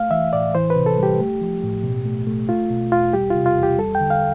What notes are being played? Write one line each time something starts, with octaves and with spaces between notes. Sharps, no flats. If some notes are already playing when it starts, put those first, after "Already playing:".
Already playing: A3 F5
E3 E5
A2 D5
E3 C5
B4
C3
A4
G3 G4
A3
F3
A2
B2
A3
A3
A3 F4
B2
E2 F4
G3 G4
C3 F4
F4
E2
G4
G3 A4
G5
D3
F5